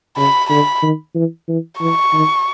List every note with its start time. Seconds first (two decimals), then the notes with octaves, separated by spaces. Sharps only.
0.17 C#3 B5
0.50 D3 B5
0.82 D#3
1.15 E3
1.48 E3
1.80 E3 C#6
2.13 D#3